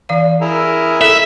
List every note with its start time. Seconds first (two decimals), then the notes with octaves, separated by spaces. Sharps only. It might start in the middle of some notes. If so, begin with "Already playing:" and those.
0.09 E3 D5 F5
0.41 E4 G#4 A#4
1.01 A4 E5